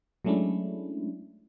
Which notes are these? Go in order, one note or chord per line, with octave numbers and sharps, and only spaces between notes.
F#3 G#3 A3 C#4 D4 E4